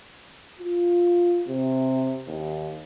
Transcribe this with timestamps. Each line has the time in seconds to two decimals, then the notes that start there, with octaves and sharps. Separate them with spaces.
0.59 F4
1.48 C3
2.27 D#2